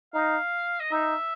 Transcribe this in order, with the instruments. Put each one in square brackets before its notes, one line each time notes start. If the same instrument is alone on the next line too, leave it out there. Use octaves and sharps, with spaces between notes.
[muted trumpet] D#4 [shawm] F5
[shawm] D#5
[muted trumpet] D#4 [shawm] E5